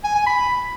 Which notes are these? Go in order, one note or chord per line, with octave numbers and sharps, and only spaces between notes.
G#5
G#5
B5